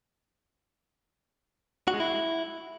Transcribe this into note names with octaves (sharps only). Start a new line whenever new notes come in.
F#4
G#3
E4